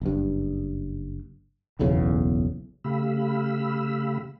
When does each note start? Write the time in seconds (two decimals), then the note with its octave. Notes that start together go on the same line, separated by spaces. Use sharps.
0.02 F#1 G2
1.79 F#1 B1 E2 C#3
2.84 C#3 A3 G4 F5 B5 E6